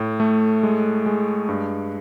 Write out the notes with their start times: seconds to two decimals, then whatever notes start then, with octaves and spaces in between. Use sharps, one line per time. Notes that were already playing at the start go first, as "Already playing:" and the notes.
Already playing: A2
0.20 A3
0.63 G#3
1.06 G#3
1.49 G2